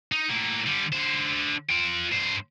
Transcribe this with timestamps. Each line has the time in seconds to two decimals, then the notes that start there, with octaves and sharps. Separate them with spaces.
0.12 D#4
0.29 A2 A#3
0.66 D3 G3
0.92 D3 C5
1.69 F4 G5
2.11 G2 C5